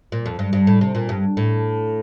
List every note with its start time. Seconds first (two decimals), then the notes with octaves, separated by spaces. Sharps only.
0.12 A#2
0.26 F2
0.39 G2
0.53 G2
0.67 A2
0.81 C3
0.95 A#2
1.09 G2
1.37 A2